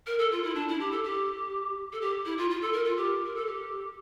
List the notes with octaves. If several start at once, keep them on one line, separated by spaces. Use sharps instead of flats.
A#4
A4
F4
E4
D4
E4
G4
A4
G4
A4
G4
E4
F4
F4
A4
A#4
F4
G4
A#4
A4
G4